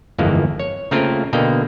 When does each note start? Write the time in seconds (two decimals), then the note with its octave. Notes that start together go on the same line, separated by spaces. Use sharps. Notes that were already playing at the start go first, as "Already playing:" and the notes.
0.18 G1 F2 E3 G#3 A#3
0.60 C#5
0.91 C#3 A3 A#3 C4 F4 A#4
1.33 B2 D3 A#3 D#5 G5